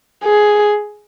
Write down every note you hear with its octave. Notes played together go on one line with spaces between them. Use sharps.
G#4